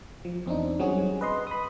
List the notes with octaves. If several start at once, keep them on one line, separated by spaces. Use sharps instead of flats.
F3
E2 C4 D4 D#4
F#3 G3 C4 C#4 F#4 G#4
B4 D#5 C6
B5 D#6